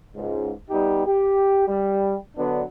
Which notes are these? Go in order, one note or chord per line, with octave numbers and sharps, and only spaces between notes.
C#2 G#2
G3 B3 D#4 G4
G4
G3
D3 F#3 B3 D4